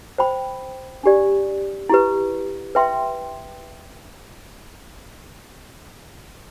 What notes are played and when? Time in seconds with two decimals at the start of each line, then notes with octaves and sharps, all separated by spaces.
0.18 C5 G5 B5
1.03 D4 G4 D5
1.89 E4 G4 B4
2.75 B4 E5 G5 C6